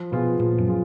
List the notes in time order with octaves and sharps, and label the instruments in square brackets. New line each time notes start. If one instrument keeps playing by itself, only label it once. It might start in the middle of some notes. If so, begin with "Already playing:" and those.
Already playing: [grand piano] F3
[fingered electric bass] B2 [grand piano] B3 F4 G#4
[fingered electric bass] A#2 [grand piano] F3
[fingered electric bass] F#2
[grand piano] F4 G#4